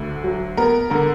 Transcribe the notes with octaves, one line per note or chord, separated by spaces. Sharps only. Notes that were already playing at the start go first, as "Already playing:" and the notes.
Already playing: D2 D3
F#3
B3 A#4
D3 A#4